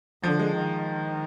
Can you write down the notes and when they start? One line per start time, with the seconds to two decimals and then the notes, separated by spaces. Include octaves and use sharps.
0.23 D3 F3
0.39 G#3
0.55 D#3